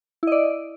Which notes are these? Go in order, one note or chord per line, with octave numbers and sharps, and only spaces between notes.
E4 D5 D#5